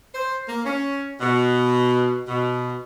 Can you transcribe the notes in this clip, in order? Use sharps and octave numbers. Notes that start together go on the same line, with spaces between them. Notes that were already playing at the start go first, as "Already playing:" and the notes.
C5
A#3
C#4
B2
B2